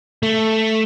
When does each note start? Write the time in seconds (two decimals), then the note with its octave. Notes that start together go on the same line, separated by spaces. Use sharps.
0.23 A3